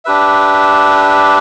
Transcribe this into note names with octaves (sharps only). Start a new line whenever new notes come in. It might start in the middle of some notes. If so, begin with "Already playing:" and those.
D4 G4 B4 E5